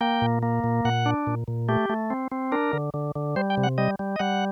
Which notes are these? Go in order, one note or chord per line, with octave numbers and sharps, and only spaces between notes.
A#3 G5
A#2
A#3
A#2
A#2 F#5
D4
A#2
A#2
A3 G4
A3
C4
C4
D4 A#4
D3
D3
D3
G3 C5
G5
C3
F#5
G3 D#5
G3
D#5
G3 F#5